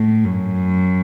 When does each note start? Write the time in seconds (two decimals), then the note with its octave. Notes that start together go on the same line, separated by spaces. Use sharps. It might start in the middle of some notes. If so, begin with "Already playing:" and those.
Already playing: A2
0.24 F#2